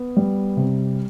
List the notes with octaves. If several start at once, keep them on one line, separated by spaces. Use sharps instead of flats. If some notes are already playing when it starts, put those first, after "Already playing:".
Already playing: B3
G3
C3